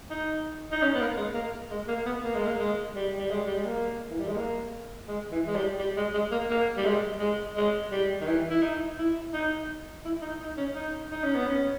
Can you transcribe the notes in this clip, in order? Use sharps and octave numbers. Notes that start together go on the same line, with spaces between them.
D#4
D#4
C#4
B3
A#3
G#3
A#3
G#3
A#3
B3
A#3
G#3
A#3
G#3
G3
G3
G#3
G3
G#3
A#3
E3
G3
G#3
A#3
G#3
E3
G#3
G3
G3
G#3
G#3
A#3
A#3
G3
G#3
G#3
G#3
G3
D#3
E3
E4
D#4
E4
D#4
E4
D#4
D#4
C#4
D#4
D#4
C#4
B3
C#4